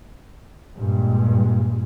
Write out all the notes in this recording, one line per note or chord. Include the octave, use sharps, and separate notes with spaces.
G2 A#2 G#3